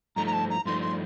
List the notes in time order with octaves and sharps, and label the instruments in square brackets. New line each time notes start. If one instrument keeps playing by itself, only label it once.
[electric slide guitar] G2 F3 A3 D#4 [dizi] A#5
[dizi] A#5
A5
A#5
[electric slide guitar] G2 F3 A3 D#4 [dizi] C6
[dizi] C6